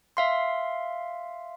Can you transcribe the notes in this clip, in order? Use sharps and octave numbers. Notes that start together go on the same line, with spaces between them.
E5 F5 C6